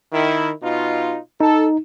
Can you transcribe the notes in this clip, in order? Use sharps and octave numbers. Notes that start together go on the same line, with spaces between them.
D#3 E4
B2 D#4 F4
D#4 A4